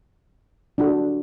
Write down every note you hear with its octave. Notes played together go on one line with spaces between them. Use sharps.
D4 F#4 A4